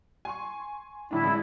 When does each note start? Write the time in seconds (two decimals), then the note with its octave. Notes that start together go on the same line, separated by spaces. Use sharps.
0.25 G#5 C6 C#6
1.11 G1 A2 D4 E4
1.24 A1 G#3